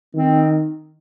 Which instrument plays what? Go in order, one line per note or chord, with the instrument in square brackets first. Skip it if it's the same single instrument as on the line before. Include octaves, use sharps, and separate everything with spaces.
[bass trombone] D#3 [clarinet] C4